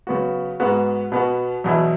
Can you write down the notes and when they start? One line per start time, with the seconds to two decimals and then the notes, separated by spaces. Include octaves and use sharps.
0.07 C#3 F#3 B3 F#4
0.60 G#2 G#3 B3 F#4
1.12 B2 B3 F#4
1.64 E2 B2 F#3 E4